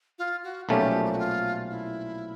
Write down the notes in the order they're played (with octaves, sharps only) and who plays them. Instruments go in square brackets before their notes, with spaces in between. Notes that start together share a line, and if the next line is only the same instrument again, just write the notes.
[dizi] F4
F#4
[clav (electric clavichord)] B1 A#2 F3 A3 C#4 [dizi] G4
[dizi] G4
F#4
F4
E4